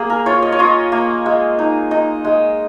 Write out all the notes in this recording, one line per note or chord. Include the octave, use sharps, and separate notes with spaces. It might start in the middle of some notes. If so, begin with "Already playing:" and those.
Already playing: A#3 G#4
A#4
F4 C#5
D#5
C#5
F4 D#5
A#3
G#3
D#4
D#4 D#5
G#3